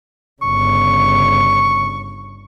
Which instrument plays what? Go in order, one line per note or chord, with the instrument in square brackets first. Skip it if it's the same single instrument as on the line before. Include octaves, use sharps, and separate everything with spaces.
[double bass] G1 C#3 [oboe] C#6